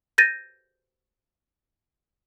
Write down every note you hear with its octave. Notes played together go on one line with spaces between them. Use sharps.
G6 A6 A#6 D#7